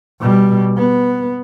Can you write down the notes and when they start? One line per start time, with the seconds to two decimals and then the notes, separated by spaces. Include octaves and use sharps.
0.21 B2 G3
0.77 B3